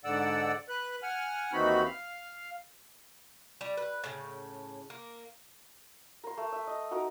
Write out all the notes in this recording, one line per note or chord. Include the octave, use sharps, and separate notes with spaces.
G#2 D3 D5 F#5 E6
B4 F#6
F#5 G#5 F6
D#2 E3 C4 D#4 F#4 B5
F5
G3
B4
A2 C#3
A#3
A#4 C6
A3
E5
D#5
D#4 F#4 A#4